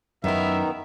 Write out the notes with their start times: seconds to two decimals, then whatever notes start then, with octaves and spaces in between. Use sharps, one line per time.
0.24 F#2 D#3 B3 D#4 E4 A#4 E5